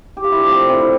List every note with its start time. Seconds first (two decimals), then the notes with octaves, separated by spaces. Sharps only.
0.17 G4
0.24 F4
0.32 E4
0.39 D4
0.46 A2 F3 A3 C4
0.69 C4 E4
0.81 E4